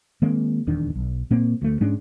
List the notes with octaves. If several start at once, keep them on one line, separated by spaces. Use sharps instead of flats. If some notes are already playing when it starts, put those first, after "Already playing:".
D#3 G#3 A#3 C4
D#1 E2 D#3 D4
B1
A#2 A#3 C4
D2 A3
G#2 G#3 C#4 D4